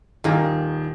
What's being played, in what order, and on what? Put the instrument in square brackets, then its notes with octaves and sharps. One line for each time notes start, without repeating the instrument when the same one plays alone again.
[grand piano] D#1 D#3 [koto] A#2 A#3